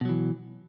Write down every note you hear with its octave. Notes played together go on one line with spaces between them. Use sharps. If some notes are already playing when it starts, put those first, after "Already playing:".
B2 E3 F#3